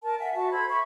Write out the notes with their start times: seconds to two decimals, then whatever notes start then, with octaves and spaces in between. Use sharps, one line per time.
0.03 A#4 A5
0.20 E5 F#5 G#5
0.34 F#4 E5 A5
0.51 A4 C5 B5 G#6
0.70 E5 B5 C#6